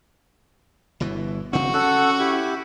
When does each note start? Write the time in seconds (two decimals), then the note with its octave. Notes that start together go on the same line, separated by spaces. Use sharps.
1.00 G1 B2 E3
1.53 F#1 C#3 C4 F#4
1.74 C#4 A4 F#5
2.19 E4 G4